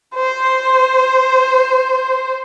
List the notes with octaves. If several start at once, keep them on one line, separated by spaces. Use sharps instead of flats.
C5